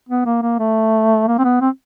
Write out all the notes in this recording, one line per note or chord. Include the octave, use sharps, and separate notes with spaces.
B3
A#3
A#3
A3
A#3
C4
B3
C4